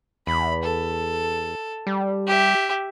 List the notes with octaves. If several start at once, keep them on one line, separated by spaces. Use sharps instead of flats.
E2 B5
A4
G3
G4 E5